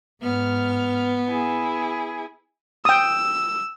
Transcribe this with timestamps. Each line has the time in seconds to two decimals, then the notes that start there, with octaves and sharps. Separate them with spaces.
0.23 G#2 B3 F6
1.28 E4 G#4
2.85 G5 D#6 E6